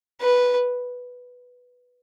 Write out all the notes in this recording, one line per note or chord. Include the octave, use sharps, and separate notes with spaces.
B4